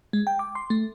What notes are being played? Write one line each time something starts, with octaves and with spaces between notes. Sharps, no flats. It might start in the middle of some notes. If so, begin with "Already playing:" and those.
G#3
G5
D6
C6
A3